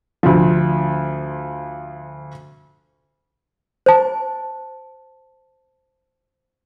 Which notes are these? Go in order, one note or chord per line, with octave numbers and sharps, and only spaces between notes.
D2 F3
C5 A5